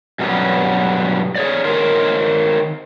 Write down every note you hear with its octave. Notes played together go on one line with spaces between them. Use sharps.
G2 B2 F#3 G3 B3 C#4
G#4 C#5 D5
D#3 A#4 C5 C#5